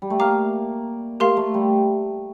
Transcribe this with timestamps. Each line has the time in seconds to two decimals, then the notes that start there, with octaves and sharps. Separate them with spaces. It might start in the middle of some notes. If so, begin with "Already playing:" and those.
0.02 G3
0.10 A3
0.20 A#3 F5 A#5 D6 F6
1.20 A3 G4 A#4 F5 C6
1.37 A3
1.54 G3